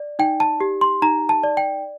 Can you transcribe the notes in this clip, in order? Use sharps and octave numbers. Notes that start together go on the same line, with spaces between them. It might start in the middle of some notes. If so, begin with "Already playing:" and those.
Already playing: D5
D#4 G5
A5
G4
C6
D#4 A#5
A5
D5
G5